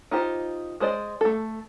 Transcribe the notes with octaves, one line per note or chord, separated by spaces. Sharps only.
D#4 F4 G4 C5
G#3 G#4 C5 D5 D#5
A3 A4